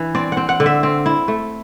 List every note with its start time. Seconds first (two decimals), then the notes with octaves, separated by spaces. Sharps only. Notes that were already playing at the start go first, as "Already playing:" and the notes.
Already playing: E3 D4
0.15 C4 D5
0.32 F#5
0.37 C4
0.49 F#5
0.60 D3
0.66 E5
0.83 C4
1.06 E4
1.28 A3